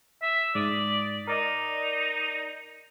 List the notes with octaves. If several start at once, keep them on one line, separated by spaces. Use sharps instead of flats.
E5
G#2 D5 D#6 B6
D#4 A#4 D5 D#5